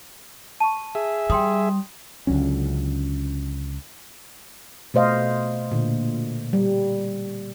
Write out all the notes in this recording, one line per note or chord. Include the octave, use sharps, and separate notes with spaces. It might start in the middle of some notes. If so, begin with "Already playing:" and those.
A5 C#6 D#7
G#4 E5
G3 G5 C6 D#6
C#2 D3 F#3 C#4
B2 A3 C5 D#5 F5
A#2 D3
G3